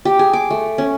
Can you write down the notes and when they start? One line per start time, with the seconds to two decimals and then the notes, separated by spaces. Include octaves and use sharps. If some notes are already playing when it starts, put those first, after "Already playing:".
0.05 G4
0.19 G#4
0.33 D6
0.50 A3
0.78 C#4